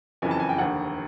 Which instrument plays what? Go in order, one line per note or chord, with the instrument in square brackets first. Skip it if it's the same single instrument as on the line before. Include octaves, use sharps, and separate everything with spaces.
[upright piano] F#1 F2 C#3 E3 G#5
A5
G#5
G5
F1 D#2 D3 F#5